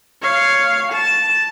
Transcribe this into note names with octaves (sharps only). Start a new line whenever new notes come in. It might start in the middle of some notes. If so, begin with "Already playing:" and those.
C#5 F5
A5